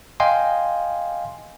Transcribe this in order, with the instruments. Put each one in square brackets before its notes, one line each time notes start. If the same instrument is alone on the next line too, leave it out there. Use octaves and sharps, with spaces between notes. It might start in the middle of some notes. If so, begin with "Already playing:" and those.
[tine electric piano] D#5 F5 G5 G#5 C6